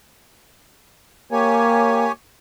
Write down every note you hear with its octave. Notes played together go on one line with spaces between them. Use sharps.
A#3 G4 C#5 G#5